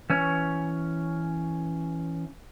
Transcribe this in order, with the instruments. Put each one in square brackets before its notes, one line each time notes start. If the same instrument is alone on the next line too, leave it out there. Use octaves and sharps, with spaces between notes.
[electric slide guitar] E3 C#4 C#5